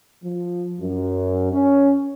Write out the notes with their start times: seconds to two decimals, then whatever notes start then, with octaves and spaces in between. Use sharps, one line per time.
0.23 F3
0.80 F#2
1.53 C#4